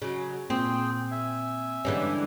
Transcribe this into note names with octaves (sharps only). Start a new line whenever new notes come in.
C#3 F#3
A#2 C4 G#4 G5 C6
E5 G#5
G2 D3 E3 G#3 B3 C#4